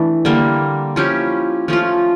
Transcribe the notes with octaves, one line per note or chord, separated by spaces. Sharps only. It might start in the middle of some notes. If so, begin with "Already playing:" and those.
Already playing: E3 A3 D4
D3 G3 A#3
F3 C#4 E4 G4
F3 A3 C#4 F4